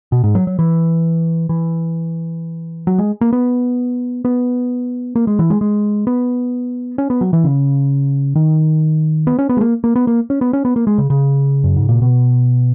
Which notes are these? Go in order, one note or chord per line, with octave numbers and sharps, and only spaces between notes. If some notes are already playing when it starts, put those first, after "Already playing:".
B2
G#2
F#3
F#3
E3
E3
F#3
G#3
A#3
B3
B3
A#3
G#3
E3
G#3
G#3
B3
C#4
B3
F#3
E3
C#3
D#3
B3
C#4
B3
G#3
A#3
A#3
B3
A#3
C#4
B3
C#4
B3
A#3
G#3
C#3
C#3
F#2
G#2
A#2
B2